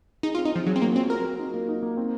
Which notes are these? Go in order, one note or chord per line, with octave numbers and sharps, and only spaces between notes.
D#4 G#4
F4
C4
D#4
F3 C4
F#3 G#4
C4
F#3 A#3
C4 F4
F#4 A#4
A#4
D#4
A#3
D#4
A#3
C4